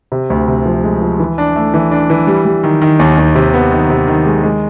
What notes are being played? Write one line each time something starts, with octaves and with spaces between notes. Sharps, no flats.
C3
D2
C3
F3
G#3
F3
E3
D4
A3
E3
D4
E3
G3
G3
D#3
D#3
D#2
D#2
C3
B3
D#3
C3
D#3
G#3
G#3